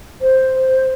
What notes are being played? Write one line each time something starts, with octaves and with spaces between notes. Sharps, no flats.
C5